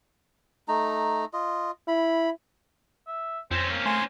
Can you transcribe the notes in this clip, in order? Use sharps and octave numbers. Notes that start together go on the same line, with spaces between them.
A3 D#4 A#5
F4 D#5
E4 B5
E5
F2 C4 C#4 C5
A#3
A3 G#5 C6